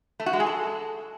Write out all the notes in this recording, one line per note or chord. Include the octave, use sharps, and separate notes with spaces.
A3
F#4
G#3
G#4
A4